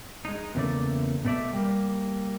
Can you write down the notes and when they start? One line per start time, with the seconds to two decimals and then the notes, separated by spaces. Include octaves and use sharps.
0.25 G#3 D#4
0.55 E2 A#2 C#3 A3 A#3 D5
1.25 B2 A3 D5 E5
1.53 G3 A#3